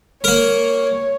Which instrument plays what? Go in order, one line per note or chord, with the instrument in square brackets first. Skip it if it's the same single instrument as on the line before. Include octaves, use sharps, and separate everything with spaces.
[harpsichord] A#3 A#4 [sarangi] C#5